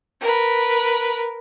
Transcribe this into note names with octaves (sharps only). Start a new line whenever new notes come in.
A#4 B4